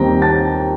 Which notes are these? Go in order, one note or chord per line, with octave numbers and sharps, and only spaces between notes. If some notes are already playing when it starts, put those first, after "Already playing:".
Already playing: D#2 D#3 G3 C4 G5 A#5 A#6
A5 A6